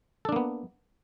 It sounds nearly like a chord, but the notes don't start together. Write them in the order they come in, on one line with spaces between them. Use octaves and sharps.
A4 D4 A#3 B3